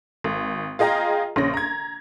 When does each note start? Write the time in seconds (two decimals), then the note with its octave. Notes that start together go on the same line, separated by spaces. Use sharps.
0.24 G#1
0.79 F4 G#4 D#5 G5 A#5
1.36 A#1 C#3 C#4 A#6
1.54 A#5 G#6